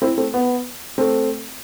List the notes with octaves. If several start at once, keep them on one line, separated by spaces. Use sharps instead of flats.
C4 E4
A3 C4
B3
A3 C4